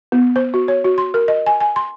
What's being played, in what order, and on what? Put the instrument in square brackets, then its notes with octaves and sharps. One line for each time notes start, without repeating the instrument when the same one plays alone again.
[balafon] B3
C5
F#4
C#5
F#4
C6
A#4
D#5
G#5
G#5
C6